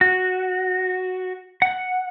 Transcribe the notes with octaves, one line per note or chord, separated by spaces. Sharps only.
F#4
F#5